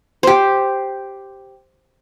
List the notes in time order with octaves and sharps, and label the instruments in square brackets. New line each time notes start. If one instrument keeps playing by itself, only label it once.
[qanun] G4 C5